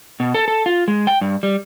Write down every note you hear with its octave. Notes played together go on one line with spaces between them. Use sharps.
B2
A4
A4
F4
G#3
G5
G2
G3